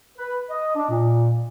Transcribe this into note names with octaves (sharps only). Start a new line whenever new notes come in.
B4
D#5
D4
A#2